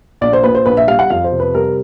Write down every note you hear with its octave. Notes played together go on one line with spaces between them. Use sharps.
A#1 D5
C5
A#2 B4
C5
A#1 B4
E5
G3 F5
F#5
F2 F5
C5
C3
B4
G3 A#4